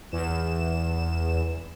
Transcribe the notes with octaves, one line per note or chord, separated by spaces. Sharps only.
E2 E7